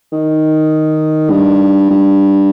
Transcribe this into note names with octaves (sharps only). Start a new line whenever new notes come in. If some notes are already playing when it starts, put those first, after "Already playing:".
D#3
G2
G2